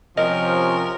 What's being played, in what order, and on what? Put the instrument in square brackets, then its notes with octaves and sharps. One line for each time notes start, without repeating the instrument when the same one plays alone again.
[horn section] C3 F3 [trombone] C#4 [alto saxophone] A#4 [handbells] D#5